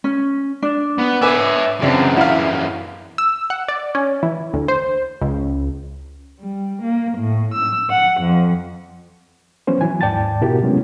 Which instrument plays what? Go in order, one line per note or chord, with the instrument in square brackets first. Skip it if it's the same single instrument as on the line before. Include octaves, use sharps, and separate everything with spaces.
[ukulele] C#4
D4
[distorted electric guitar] B3
[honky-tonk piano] B4 G#5 D6 [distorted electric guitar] C#5 E5
[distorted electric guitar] F#2 E3 [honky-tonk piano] C#3 C4 D4
[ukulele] E4 [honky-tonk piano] F5 F#5
[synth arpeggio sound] E6
F#5
D5
C#4
E3
D2
C5
C#2
[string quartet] G3
A#3
A2
E6
F#5
F2
[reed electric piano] E3 F#3 B3 C#4 C5
E3 F#3 G#5
D#2 G#2 D5 G5 A5 A6
B2 B3 E4 F#4 G4 A#4
C3 F#3 G#3 A3 B3 C#4